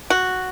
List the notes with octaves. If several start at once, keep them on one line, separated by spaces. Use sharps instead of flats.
F#4